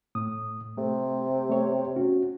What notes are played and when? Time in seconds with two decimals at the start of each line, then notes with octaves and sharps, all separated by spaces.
0.15 A2 A3 D#6
0.78 C3 A3
1.49 A3 B3 C#5
1.96 C#4 F#4